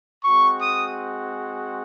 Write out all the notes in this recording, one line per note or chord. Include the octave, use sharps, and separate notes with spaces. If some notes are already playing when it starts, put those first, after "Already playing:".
G#3 C4 F#4 C#6
D#6